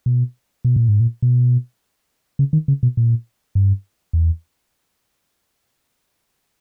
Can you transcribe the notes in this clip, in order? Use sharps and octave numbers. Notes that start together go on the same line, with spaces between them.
B2
B2
A#2
G#2
A#2
B2
C#3
D#3
C#3
B2
A#2
G2
E2